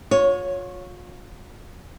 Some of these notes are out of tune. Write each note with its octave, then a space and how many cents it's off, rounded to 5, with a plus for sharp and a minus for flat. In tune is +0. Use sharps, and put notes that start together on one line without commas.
F4 +40 C#5 +0